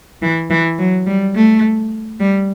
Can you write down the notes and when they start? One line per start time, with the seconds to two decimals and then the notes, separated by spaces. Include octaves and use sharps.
0.22 E3
0.50 E3
0.79 F#3
1.06 G3
1.35 A3
2.20 G3